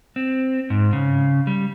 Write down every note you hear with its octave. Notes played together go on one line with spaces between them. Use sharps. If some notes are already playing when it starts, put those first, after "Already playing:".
C4
G#2
C#3
G3